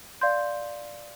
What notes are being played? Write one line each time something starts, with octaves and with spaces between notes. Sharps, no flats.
D5 F5 C6 G6